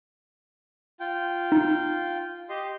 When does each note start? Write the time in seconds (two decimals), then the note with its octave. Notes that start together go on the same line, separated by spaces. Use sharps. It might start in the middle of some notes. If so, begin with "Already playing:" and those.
1.00 F4 G5
1.52 D#4
2.49 G4 D#5 C6